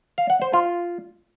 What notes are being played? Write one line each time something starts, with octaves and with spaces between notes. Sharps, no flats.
F5
F#5
C5
F4